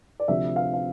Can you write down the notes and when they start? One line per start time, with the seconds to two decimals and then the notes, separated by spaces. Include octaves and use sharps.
0.20 D5
0.28 D2 C3 F3 E5
0.56 F5
0.74 F5